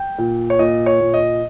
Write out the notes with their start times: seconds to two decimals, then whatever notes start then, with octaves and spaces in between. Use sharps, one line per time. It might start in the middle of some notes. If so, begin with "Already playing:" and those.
Already playing: G5
0.18 A#2
0.50 C#5
0.59 A#2 D#5
0.86 C#5
1.01 A#2
1.14 D#5